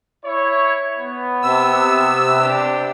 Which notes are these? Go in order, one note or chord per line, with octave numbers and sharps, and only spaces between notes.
E4 C#5
B3
C3 E6
D4 G4 C5